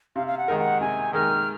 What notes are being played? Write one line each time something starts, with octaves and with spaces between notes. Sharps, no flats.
C3 F5
F5
F#5
D#3 G#3 D#4 A#4
F#5
C3 G#5
D#3 G#3 D#4 A#4 F6